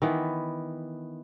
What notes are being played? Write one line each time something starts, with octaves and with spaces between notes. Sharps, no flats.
D#3 E3 B3